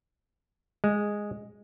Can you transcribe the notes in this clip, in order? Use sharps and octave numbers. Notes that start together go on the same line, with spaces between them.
G#3